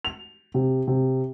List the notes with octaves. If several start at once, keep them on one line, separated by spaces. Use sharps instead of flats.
F7
C3
C3